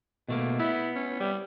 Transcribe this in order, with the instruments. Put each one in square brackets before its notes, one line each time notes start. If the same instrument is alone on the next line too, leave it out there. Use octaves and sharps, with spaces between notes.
[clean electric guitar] B2 A3 A#3
[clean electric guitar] B3 [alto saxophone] E4
[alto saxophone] C#4
G3